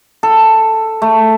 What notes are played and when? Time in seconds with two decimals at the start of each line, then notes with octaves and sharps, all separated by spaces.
0.23 A4
1.02 A3